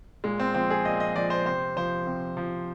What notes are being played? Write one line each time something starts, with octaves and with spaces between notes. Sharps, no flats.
A#2 G#3
C4
F3 C4
G#4
A#2 D#5
D#5
F3 D5
C5
C3 C5
F3 C5
C3
F3